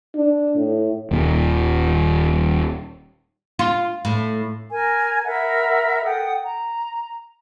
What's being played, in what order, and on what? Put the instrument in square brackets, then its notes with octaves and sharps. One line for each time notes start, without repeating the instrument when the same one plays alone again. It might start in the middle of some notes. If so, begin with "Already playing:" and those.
[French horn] D4
A2
[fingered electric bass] D#1 A#2
[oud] F4
A2
[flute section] A#4 G#5
A#4 E5 F#5 B5
A4 F#5 G5 D#6
A#5